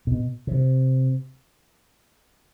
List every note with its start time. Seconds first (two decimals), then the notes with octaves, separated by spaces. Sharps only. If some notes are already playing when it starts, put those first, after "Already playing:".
0.07 B2
0.47 C3